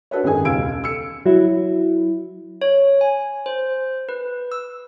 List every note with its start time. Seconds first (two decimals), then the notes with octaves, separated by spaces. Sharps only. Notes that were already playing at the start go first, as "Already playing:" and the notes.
0.11 D4 F#4 A4 B4 C#5
0.23 G#1 F#2 D#3 G4 G#4 G#5
0.45 E1 C#2 F5 E6 G#6 D7
0.71 A4
0.84 E6 C#7
1.26 F#3 E4
2.62 C#5
3.01 G#5
3.46 C5
4.09 B4
4.52 E6